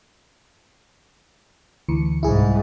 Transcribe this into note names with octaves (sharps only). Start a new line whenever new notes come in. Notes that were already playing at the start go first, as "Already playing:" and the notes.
D2 E3 C#7
C2 G#2 E4 G#4